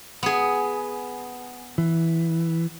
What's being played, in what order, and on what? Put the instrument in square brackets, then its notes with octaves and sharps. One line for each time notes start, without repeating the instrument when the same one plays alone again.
[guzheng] B3 G#4
[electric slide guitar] E3